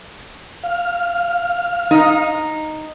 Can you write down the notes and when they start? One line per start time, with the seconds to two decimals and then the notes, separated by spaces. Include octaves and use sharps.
0.64 F5
1.91 D#4